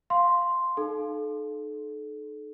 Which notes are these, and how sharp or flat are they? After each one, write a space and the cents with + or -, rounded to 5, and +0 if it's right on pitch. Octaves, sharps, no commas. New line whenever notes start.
F5 +0 C6 +0
D#4 -35 A4 -30